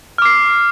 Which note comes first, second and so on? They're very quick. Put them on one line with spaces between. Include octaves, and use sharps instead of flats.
F6 D6 C7